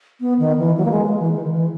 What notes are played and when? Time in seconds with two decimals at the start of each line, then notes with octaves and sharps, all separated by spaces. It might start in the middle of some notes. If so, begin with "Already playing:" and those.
0.21 B3
0.39 D#3
0.58 E3
0.77 F#3
0.85 A#3
0.91 G#3
1.05 G#3
1.19 E3
1.33 D#3
1.44 D#3
1.52 E3